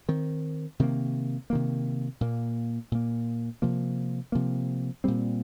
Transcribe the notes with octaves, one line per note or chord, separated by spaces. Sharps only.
D#3 C4
C3 D#3 A#3
C3 D#3 A#3
A#2 A#3
A#2 A#3
C3 F3 A#3
C3 F3 A#3
A#2 G3 C4